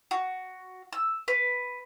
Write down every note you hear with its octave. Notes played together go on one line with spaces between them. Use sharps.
F#4
E6
B4